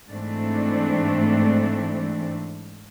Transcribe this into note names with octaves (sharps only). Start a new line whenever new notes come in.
G#2 E3 A3 C4 D4